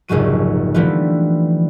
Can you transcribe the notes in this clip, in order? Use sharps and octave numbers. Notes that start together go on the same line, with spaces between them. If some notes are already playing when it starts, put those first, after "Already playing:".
F1 A#1 G#2 C#3 F#3 D#7
D3 E3 F3 G3 A3 B3